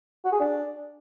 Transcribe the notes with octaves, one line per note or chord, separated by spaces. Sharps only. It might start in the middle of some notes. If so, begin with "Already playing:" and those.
F#4
G#4
D4